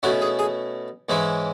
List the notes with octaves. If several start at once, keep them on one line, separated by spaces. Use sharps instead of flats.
B2 A3 C#4 E4 F#4
G#4
G#4
G#2 E3 G#3 C#4 E4